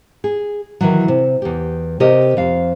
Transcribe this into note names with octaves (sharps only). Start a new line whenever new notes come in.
G#4
D#3 E3 F#3
C3
E2 G4
C3 G4 A#4 D#5
F2 F5